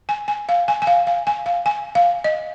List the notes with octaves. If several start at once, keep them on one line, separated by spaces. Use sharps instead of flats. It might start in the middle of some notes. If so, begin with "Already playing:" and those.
G#5
G#5
F5
G#5
G#5
F5
F5
G#5
F5
G#5
F5
D#5